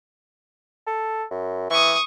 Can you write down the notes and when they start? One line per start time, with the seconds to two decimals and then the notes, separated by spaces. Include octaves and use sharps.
0.87 A4
1.31 F#2
1.71 E3 C#6 D#6